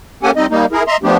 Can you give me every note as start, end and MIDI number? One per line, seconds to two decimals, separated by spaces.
0.23 0.31 58
0.23 0.31 61
0.23 0.31 67
0.23 0.31 69
0.23 0.31 78
0.23 0.31 80
0.36 0.46 55
0.36 0.46 60
0.36 0.46 63
0.36 0.46 75
0.51 0.66 55
0.51 0.66 58
0.51 0.66 63
0.72 0.83 64
0.72 0.83 68
0.72 0.83 70
0.87 0.97 75
0.87 0.97 76
0.87 0.97 82
0.87 0.97 84
1.03 1.17 53
1.03 1.17 57
1.03 1.17 59
1.03 1.17 62
1.03 1.17 67